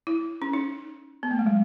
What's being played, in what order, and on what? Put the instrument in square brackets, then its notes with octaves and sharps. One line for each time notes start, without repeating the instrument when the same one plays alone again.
[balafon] E4
C#4
D#4
B3
A3
G#3
F#3